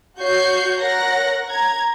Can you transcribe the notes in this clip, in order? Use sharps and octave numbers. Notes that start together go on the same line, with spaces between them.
F#4 C#5 C#6 G6 C7
A#4 C#5 F#5 A#6
A#5 G#6